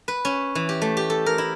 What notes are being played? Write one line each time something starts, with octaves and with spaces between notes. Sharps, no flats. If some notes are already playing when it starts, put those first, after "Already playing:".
B4
C#4
E3
G4
A3
G4
A4
A#4
E4